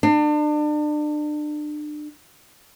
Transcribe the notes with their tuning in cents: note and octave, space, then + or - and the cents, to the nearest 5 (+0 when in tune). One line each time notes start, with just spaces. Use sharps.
D4 +35